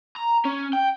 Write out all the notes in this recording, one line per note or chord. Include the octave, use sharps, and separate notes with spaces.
A#5
C#4
G5